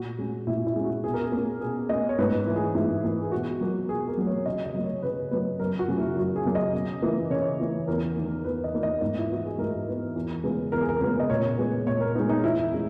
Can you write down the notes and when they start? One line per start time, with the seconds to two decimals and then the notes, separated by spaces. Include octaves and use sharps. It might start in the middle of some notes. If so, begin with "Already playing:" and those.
Already playing: A#2 F#4
0.19 G#3 C#4
0.47 A#2 E4
0.67 E4
0.76 G#3 C#4
0.85 F#4
1.04 B2 G#4
1.14 A#4
1.23 G#4
1.32 A#3 C#4
1.61 B2 G#4
1.89 A#3 C#4 D#5
2.09 C#5
2.18 G#2 B4
2.46 E3 A#3
2.56 G#4
2.75 G#2 E4
3.04 E3 A#3
3.22 G#4
3.32 B2 F#4
3.61 F#3 A#3
3.89 B2 G#4
4.08 A#4
4.18 F#3 A#3
4.27 C#5
4.46 C#3 D#5
4.66 D#5
4.74 F#3 A#3
4.84 C#5
5.02 C#3 B4
5.31 F#3 A#3 B4
5.59 F#2 A#4
5.79 F#4
5.88 C#3 F#3 A#3 C#4
5.98 E4
6.16 F#2 F#4
6.36 G#4
6.45 C#3 F#3 A#3 C#4
6.55 D#5
6.74 C#3
7.02 E3 A#3
7.30 C#3 C#5
7.60 E3 A#3
7.88 E2 A#4
8.16 D#3 A#3
8.45 E2 B4
8.64 D#5
8.73 D#3 A#3
8.83 D#5
9.01 G#2 D#5
9.18 E4
9.30 E3 B3 F#4
9.45 G#4
9.58 G#2 A#4
9.87 E3 B3
10.16 E2
10.44 C#3 G#3 B3
10.72 E2 A#4
10.81 G#4
10.89 A#4
11.01 C#3 G#3 B3 A#4
11.20 D#5
11.30 A#2 C#5
11.58 G#3 B3
11.86 A#2 C#5
12.01 A#4
12.15 G#3 B3 D#4
12.29 D#4
12.43 E2 E4
12.72 G#3 C#4